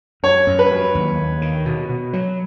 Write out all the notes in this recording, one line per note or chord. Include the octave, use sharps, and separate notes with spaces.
F#2 C#5
F#2
B4
F#3
D#2
D#2
D#3
B2
B2
F#3